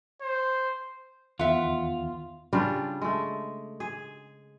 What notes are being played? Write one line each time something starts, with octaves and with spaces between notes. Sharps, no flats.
C5
E2 D#3 B3 F4 E5 F#5
C#3 G3 D4 F4
G#3 A3
G#4